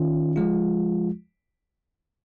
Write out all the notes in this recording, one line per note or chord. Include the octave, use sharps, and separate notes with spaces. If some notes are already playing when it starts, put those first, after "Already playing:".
Already playing: D#3 C#4 F4
F3 G#3 F4